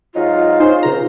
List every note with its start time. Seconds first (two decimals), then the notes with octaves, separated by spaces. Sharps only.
0.15 G#2 F#3 D#4 F4
0.60 C#4 D#4 G#4 C5
0.83 C#2 C3 A#5